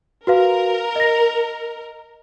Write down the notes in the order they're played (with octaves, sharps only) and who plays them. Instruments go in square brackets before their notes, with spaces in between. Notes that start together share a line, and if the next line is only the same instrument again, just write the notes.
[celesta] F#4 B4 F5 [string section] A#4
[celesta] D#5 A#6